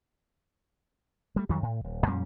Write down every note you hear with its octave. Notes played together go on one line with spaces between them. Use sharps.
G3 A3
F2 D#3 F#3 G3
A2
D#1
F2 A#2 G3 C#4